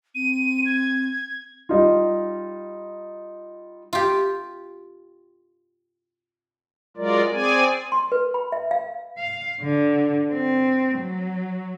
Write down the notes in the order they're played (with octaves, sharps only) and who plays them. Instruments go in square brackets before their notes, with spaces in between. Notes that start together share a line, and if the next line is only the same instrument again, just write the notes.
[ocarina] C4 [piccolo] D#7
[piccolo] G#6
[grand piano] G3 D#4 F4
[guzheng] F4 G4
[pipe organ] F#3 G#3 F4 A#4 D5
C4 G#4 D5 G#5
[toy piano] C6
B4
B5
E5
F5
[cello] F5
D3
C4
F#3